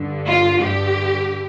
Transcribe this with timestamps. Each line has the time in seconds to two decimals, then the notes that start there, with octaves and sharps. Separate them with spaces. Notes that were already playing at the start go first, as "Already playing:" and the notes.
Already playing: G2 D3
0.27 F4
0.63 G2 D3 G4